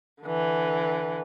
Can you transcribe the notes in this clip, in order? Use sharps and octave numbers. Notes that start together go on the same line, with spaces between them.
D3 E3